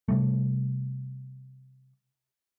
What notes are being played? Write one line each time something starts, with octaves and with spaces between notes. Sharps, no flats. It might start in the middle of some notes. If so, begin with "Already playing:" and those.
C3 G3 A3